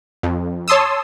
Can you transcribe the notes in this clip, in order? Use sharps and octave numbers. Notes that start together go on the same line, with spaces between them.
F2
C#5 A5 C6 D#6 E6